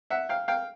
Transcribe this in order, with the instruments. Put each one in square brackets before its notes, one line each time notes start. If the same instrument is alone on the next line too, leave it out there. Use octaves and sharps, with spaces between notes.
[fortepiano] E5 F#5
F5 G5
F5 G5